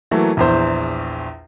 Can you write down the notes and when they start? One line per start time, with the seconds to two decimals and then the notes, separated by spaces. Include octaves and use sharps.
0.11 E3 F#3 A3 A#3
0.37 A#1 E2 C5